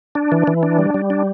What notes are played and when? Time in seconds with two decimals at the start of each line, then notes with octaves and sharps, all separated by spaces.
0.15 D4
0.32 E3
0.47 E3
0.63 D4
0.79 G3
0.94 G3
1.10 D4